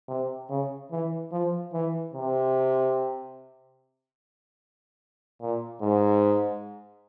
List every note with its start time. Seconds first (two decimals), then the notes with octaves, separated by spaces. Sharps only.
0.08 C3
0.50 C#3
0.91 E3
1.32 F3
1.73 E3
2.14 C3
5.41 A#2
5.82 G#2